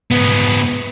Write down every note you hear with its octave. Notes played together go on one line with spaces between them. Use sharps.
G#2 B3